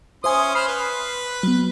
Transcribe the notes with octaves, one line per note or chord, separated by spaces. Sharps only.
C#4 C5 E5 G#5 C6 D#6
C5 B5 F6 C7
B4
F#3 B3